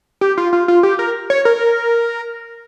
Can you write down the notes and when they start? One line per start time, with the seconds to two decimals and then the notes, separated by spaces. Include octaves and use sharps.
0.21 G4
0.38 F4
0.53 F4
0.68 F4
0.83 G4
0.99 A#4
1.30 C#5
1.45 A#4